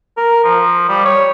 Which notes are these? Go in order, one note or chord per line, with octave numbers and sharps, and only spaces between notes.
A#4
F3
G3
C#5